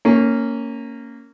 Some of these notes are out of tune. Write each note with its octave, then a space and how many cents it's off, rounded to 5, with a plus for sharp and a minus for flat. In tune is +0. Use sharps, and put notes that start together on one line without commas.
A#3 -15 C#4 +0